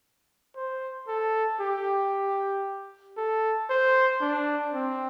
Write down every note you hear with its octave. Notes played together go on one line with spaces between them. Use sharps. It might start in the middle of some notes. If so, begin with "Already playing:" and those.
C5
A4
G4
A4
C5
D4
C4